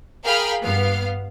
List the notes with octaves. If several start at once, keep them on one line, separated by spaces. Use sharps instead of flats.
G#4 A#4 F5 G5 B5 F6
G2 B3 F5